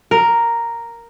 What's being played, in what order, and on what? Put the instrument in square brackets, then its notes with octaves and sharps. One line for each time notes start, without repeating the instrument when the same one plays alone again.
[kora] A#4